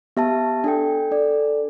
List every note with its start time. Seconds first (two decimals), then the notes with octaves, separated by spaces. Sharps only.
0.17 B3 G4 E5 A5
0.64 D4 A4 G5
1.11 D4 A4 D5